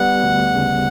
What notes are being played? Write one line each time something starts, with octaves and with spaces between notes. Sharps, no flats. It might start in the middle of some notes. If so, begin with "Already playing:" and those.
Already playing: G3 B3 F#5
D2
C#3